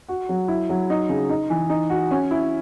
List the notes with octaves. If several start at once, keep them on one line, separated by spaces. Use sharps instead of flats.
F#4
F#3
E4
F#3
D#4
C#3
D#4
E3
D#4
F#4
C#4
E4